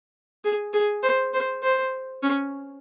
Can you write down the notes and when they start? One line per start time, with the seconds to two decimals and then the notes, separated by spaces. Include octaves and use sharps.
0.44 G#4
0.73 G#4
1.03 C5
1.34 C5
1.63 C5
2.23 C#4